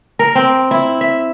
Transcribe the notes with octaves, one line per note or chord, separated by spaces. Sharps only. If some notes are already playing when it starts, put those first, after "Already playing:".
A#4
C4
E4
E5